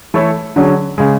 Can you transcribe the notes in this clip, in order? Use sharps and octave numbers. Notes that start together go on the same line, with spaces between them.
E3 A3 E4 A4 C#5
D3 F#3 C#4 G#4
C#3 G#3